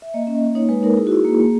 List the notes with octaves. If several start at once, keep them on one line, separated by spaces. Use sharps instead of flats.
E5
A#3 D#5
C#4
D#5
A#3
D#4 C#5
G#3 B4
D#4 A#4
E4 G#4
F#4
E4 G#4
A#3
A#3